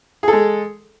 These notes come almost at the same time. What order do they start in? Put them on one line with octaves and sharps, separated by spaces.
G#4 A4 G#3